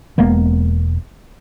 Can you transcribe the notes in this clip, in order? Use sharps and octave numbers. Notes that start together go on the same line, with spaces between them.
E1 G#3 A#3 B3